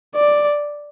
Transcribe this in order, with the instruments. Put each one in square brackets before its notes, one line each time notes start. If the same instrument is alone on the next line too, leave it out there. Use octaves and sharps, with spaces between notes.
[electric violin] D5